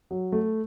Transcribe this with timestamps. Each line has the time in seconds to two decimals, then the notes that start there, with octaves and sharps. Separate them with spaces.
0.11 F#3
0.32 A3